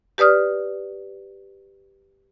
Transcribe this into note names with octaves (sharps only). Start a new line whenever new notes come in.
G4 B4 D5 D#6 F6